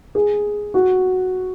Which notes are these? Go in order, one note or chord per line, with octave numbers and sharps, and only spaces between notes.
G#4
F#4